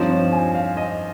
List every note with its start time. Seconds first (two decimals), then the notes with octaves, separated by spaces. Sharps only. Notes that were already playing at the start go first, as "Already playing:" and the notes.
Already playing: G2 F3 C4 D#4 C#5
0.10 C#5
0.32 G#5
0.55 F5
0.77 D#5